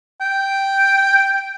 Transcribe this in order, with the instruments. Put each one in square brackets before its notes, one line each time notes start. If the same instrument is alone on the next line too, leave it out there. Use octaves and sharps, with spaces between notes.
[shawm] G5